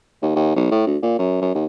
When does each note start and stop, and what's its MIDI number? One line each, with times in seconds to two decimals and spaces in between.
0.22 0.33 39
0.35 0.53 39
0.56 0.69 35
0.71 0.86 45
0.87 0.97 38
1.03 1.14 46
1.19 1.36 42
1.41 1.50 42
1.54 1.65 39